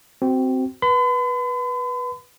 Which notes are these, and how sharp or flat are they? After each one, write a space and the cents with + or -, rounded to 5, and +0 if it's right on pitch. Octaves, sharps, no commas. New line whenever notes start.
C4 -10 F#4 +25
B4 -15 B5 +45